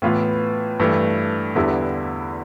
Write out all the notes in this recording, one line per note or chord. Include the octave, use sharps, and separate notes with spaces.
A2 E3 B3 F4 B4
G2 E3 A3
E2 D3 G3 B3 E4